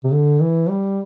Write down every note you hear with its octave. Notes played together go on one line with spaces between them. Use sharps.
C3
D3
E3
G3